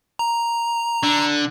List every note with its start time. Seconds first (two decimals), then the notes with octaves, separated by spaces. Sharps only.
0.19 A#5
1.03 D3